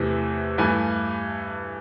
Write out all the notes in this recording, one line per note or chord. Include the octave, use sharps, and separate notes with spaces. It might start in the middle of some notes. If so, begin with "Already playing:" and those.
Already playing: E2 C3 E3 A3
G2 E3 A3 G#5